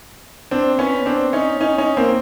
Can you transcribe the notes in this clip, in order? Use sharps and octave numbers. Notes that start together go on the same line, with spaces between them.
C4 D4
B3 C#4
C4 D4
C#4 D#4
C#4 D#4
C#4 D#4
A#3 C4